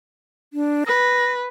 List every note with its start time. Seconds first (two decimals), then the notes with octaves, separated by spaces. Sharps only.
0.53 D4
0.87 B4 A#6